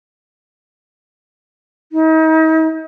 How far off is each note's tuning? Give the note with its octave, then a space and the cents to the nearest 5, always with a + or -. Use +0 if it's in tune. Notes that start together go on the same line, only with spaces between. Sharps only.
D#4 +40